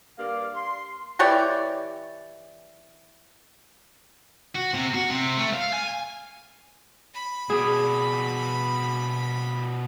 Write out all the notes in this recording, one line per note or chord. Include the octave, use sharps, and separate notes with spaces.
G2 A#3 D5 F5
C6
E3 G4 C#5 D5
F#4
C3
F#4
C3
A3
F5
G#5
B5
B2 D4 G#4